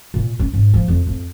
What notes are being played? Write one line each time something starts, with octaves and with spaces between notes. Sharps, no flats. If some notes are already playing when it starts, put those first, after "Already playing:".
A#2
C#4
G#2
F3
F2
F2